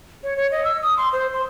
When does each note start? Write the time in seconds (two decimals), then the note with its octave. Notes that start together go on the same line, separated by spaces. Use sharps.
0.23 C#5
0.37 C#5
0.51 D#5
0.64 E6
0.83 D#6
0.97 C6
1.13 C5
1.34 C6